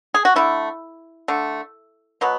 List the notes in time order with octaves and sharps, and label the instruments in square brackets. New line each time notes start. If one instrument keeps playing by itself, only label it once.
[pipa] G#4
F#4
D3 A3 E4
D3 A3
B2 F#3 B3